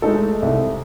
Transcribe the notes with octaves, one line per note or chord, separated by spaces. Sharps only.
G#3 A3 D#4 A4
C2